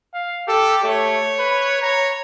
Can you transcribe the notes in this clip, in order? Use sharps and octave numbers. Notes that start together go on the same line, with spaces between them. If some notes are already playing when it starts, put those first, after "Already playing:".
F5
G4 A4
A3 C#5
B4
C#5 A#5